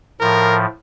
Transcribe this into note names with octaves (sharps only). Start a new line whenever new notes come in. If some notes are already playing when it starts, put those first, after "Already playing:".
A2 F3 A#4